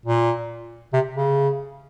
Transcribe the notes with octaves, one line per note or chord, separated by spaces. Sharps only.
A#2
C3
C#3